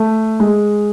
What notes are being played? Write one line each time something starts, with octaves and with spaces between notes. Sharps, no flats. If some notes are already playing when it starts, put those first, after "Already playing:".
Already playing: A3
G#3